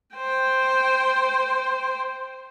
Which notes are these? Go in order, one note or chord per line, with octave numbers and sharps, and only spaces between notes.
C5 G5